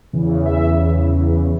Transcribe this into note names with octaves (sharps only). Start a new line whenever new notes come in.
E2 C#3 E3
E5